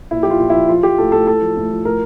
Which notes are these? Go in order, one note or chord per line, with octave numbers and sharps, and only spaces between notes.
A#2 E4
G4
F3 F4
A#2 F4
F3 E4
F3 F4
F3 G4
A2 A4
A2 A4
A2 A4
F3
A2
F3
A2 A#4